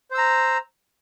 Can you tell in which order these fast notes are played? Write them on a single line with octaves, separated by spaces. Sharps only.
C5 E6 A#5